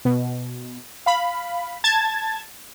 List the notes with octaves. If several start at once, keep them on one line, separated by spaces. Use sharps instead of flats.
B2
F5 B5
A5 G#6 A6